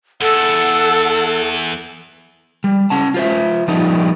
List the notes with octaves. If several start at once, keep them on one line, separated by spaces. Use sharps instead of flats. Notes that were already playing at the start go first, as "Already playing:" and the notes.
E2 A4 F#5 E6
G3
C#4 F#5 A5
F4 C5 E5
F3 G3 B3 D#4